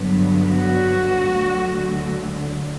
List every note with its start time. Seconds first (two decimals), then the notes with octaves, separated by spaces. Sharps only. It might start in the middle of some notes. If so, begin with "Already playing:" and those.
Already playing: G2 D3 F#3 B3
0.50 F#4
1.35 D2 D3 F#3